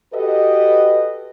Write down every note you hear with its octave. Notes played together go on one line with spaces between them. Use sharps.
F#4 G4 A4 B4 D#5